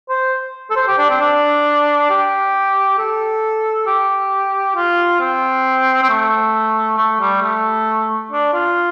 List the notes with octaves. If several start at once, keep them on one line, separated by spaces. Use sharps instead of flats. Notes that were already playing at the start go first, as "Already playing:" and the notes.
C5
A4
C5
G4
D4
C4
D4
G4
A4
G4
F4
C4
C4
A3
A3
G3
A3
D4
F4